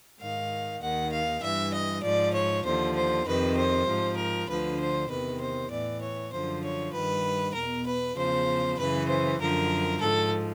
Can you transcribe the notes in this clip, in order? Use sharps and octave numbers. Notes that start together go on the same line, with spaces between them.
G#2 D#3 F5
D#2 D#3 F#5
F5
G2 E3 E5
D#5
G#2 F3 D5
C#5
D#2 D3 F3 C5
C5
F2 C3 D#3 B4
C5
G#2 F3
A#4
D2 D3 F3 B4
C5
E2 C3 D#3 B4
C5
A2 E3 D5
C#5
F#2 D3 F3 C5
C#5
G2 D#3 B4
E2 B2 A#4
B4
E2 C#3 F3 C5
F#2 C#3 E3 B4
C5
F#2 D3 F3 A#4
G#2 F3 A4